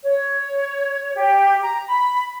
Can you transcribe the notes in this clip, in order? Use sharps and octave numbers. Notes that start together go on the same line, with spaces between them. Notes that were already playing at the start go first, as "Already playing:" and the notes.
C#5
G4
A#5
B5